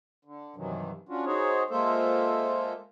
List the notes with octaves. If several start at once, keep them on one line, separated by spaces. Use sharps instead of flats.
D3
G2 C3 D#3 E3 F#3
C#4 D4 F4 F#4
D#4 F#4 G#4 C5 C#5
G#3 A#3 F4 A4 C5 E5